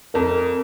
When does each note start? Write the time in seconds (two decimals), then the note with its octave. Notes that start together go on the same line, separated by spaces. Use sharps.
0.14 F2 A#4